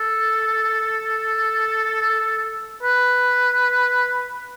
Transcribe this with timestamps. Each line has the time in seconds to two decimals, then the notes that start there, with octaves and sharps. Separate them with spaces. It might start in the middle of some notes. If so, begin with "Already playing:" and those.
Already playing: A4
2.83 B4